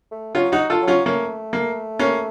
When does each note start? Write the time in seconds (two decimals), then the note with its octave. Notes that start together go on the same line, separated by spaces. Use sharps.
0.11 A3
0.35 F#3 C#4 F4
0.52 D#4 F#4
0.70 F4 A4
0.82 F#3
0.88 C#4 F4
1.06 A3 A#3 C#4
1.53 A#3
1.99 A#3 C#4